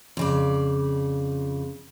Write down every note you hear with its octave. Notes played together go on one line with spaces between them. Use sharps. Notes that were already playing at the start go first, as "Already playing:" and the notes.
F2 C#3 D5